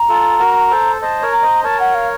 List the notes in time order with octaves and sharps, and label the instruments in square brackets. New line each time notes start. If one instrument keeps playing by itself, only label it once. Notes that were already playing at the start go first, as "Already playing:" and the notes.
Already playing: [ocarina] A#5
[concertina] F4 A4
F#4 A#4
A4 C5
[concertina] C5 D#5 [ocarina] A5
[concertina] A#4 C#5
[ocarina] A#5
[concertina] C5 D#5
[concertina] A#4 C#5 [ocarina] A5
[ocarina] F#5
F5